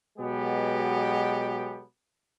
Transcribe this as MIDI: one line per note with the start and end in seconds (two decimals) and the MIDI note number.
0.19 1.83 47
0.19 1.83 54
0.19 1.83 56
0.19 1.83 59
0.19 1.83 67
0.19 1.83 69